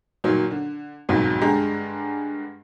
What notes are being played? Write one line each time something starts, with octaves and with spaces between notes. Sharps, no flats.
A#2 D#3 F#3 A#3
D3
B1 F2 G#2 D#3 F#3
G2 D3 G#3 G4 A#5